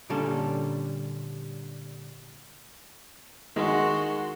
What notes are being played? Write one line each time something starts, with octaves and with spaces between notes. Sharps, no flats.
A#2 D3 G3 C#4 A4
D#3 G#3 F#4 C6